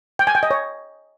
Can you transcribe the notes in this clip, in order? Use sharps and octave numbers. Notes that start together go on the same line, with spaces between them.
G5
G#5
G5
D#5
C#5